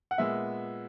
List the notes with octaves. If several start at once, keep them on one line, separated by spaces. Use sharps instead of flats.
F#5
A#2 G#3 B3 E5